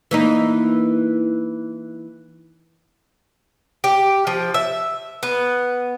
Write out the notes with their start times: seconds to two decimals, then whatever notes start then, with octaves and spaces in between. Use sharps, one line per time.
0.11 E3 A#3 D#4
3.84 G4
4.27 F3
4.54 E5
5.23 B3